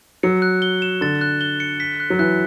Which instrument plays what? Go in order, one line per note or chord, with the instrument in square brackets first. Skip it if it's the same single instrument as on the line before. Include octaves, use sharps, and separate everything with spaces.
[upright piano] F#3 [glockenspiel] C#7
[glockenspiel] F#6
G7
E7
[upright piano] D3 [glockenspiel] A6
[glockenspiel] F#6
G7
C#7
B6
F#6
[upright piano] F#3
[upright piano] E3 [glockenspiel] F#6